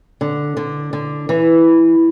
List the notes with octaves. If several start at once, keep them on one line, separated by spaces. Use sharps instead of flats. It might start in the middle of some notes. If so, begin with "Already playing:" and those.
D3
D3
D3
E3